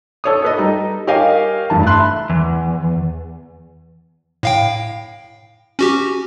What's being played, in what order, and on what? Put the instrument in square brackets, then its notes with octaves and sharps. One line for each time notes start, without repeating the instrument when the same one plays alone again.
[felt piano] A4 C#5 D#6
A4 B4 D#5
G3 D#4
G4 A#4 C#5 D#5 F5 G#5
F1 G2 E3 A5
E5 A5 B5 C6 F#6
[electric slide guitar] E2
[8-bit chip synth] A2 F5 G5
C#4 F#4 G4